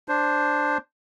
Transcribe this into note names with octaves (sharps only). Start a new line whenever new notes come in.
D4 C5